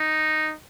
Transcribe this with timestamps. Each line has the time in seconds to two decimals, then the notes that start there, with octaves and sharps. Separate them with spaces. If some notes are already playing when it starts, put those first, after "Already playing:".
Already playing: D#4